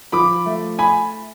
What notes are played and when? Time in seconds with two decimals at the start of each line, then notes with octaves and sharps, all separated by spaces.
0.12 F3 B5 D6
0.46 A3
0.79 G#5 B5